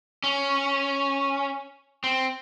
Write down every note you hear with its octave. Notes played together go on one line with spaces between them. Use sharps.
C#4
C4